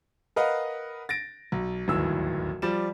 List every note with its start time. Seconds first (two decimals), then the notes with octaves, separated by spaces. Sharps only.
0.36 A#4 B4 D#5 F5 F#5
1.09 A6 A#6 D7
1.52 B1
1.88 D1 G1 D#2 E3 E6
2.62 F3 G3 D5 E7